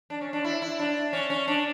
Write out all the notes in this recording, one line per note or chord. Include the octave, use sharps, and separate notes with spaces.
D4
C#4
D4
E4
E4
D4
C#4
C#4
D4